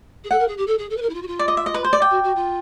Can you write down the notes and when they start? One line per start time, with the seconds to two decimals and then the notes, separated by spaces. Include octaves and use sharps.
0.24 G#4
0.31 A4 F#5
0.39 A#4
0.48 G#4
0.58 G4
0.67 A4
0.78 G#4
0.90 A4
0.97 B4
1.02 A#4
1.09 E4
1.14 F4
1.22 F#4
1.27 F4
1.39 D5
1.48 D#5
1.57 E5
1.66 D#5
1.74 B4
1.84 C5
1.93 D5
2.02 G5
2.11 F#4
2.24 F#4
2.36 F4